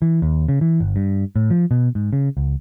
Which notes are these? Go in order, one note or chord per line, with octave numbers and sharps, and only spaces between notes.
E3
D#2
C#3
E3
G1
G2
A2
F3
B2
G#2
C#3
C#2